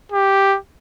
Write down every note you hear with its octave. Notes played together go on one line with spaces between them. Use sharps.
G4